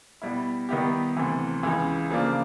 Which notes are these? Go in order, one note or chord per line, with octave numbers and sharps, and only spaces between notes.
B2 G3 B3 E4
D#3 G3 B3 E4 G4
D2 C3 E3
C#2 C#3 E3
C#3 F3 A#3 D4 F4